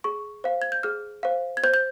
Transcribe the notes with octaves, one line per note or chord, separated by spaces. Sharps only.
G#4 C#6
C5 F5
G#6
G6
G#4 F6
C5 F5
G#6
C5 G6
G6